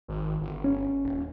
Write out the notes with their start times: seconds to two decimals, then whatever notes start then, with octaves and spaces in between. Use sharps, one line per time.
0.08 G#1
0.41 G1
0.64 C#4
1.04 D#1